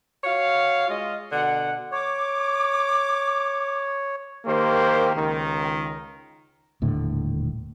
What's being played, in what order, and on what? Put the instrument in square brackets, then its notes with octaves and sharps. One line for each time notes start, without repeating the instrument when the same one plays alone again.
[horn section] F#4 C#5 F5
G#3 F4 D#5
B2 D3 F#5
[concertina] C#5 [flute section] D6
[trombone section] D#3 A#3 G4 C5
C#2 D#3
[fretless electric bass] D#1 A2 D3